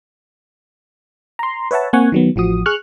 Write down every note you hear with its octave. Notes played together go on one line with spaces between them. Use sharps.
A#5 C6
B4 C#5 E5 F#5 A5
A#3 C4 F#5 G#5 C#6
D#3 F#3 B3
A1 F3 F#4 D#6
G#4 C#6 F6 F#6